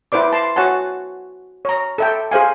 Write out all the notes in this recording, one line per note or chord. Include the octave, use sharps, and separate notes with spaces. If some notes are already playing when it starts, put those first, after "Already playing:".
E4 B4 C5 D5 D6
A5 C6
F#4 C#5 F#5 G#5 A5
C#5 A#5
A4 E5 G5
G#4 C5 F5 G#5